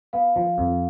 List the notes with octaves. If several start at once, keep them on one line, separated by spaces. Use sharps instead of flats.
B3 F5
F3
F2